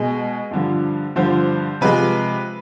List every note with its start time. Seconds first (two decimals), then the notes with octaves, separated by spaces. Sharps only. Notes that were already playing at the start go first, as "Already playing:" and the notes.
Already playing: B2 G#3 G#4
0.51 G2 D3 F3
1.16 G2 D3 F3 C5
1.81 C3 F3 G#3 B4